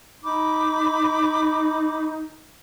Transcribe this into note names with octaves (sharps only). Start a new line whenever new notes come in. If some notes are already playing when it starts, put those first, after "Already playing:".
D#4 B5 D6